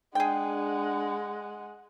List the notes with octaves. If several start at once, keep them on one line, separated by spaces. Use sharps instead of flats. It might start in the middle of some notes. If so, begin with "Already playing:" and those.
G#3 D4 G#4 F#5 G5